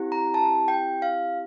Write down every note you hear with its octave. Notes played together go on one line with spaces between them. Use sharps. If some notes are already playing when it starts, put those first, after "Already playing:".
Already playing: C4 E4 G4
A#5
A5
G5
F5